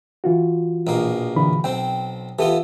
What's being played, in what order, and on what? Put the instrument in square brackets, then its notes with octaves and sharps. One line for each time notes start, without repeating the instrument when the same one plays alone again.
[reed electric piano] E3 F4 F#4
[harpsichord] A#1 B2 A#3
[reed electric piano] D3 E3 B5
[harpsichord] B1 C4 [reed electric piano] G5
[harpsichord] E3 B3 F4 [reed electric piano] G4 A4